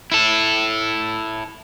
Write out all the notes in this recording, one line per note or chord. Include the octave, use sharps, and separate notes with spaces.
E4 A4